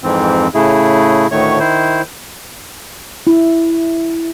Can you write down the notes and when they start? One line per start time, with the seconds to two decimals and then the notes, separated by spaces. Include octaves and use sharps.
0.03 F2 G#2 E3 C4
0.54 A2 C#3 A3 E4 G#4
1.31 D2 A2 D#3 A3 C#5 C#6
1.59 D#3 E4 C5
3.27 E4